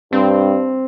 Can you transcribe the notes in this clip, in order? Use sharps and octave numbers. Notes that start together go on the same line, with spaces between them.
G2 C4